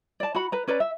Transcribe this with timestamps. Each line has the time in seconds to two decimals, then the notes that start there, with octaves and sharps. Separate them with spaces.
0.20 D5 A5
0.35 F#4 F#5 B5
0.52 B4 A#5
0.68 C#4 B4 D5 A#5
0.80 E5